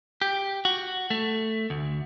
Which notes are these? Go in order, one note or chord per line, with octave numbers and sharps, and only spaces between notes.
G4
F#4
A3
D2